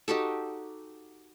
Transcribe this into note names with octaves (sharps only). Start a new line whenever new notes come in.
D#4 F#4 G4 A4